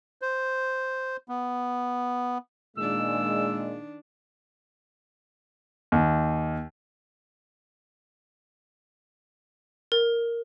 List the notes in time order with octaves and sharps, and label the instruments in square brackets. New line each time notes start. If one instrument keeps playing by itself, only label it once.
[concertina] C5
B3
[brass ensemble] A#2 G#3 [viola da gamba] D#3 D4 [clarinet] E6
[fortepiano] D#2
[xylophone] A#4